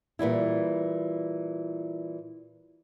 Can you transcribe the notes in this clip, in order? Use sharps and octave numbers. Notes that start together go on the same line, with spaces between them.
A#2 E3 G3 E4